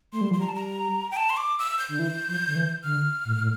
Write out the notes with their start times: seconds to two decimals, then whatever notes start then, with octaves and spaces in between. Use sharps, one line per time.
0.12 A3 C6
0.21 G3
0.31 F3 C6
0.40 G3 A#5
0.48 A5
0.55 A#5
1.11 G5
1.16 A5
1.29 C6
1.37 D6
1.59 E6
1.79 G6
1.88 D3
1.99 E3
2.28 F3
2.47 D3
2.56 E3
2.83 D3 F6
3.25 A2
3.40 A2